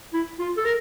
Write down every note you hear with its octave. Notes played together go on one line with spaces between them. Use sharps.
E4
F4
A4
A#4